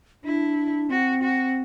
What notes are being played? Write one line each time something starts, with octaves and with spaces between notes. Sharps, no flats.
D4 E4
C4 F#4
F#4